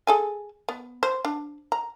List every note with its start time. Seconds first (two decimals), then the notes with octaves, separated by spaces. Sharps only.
0.07 G#4 A4 G#5
0.69 B3
1.03 C5
1.25 D4
1.72 A#5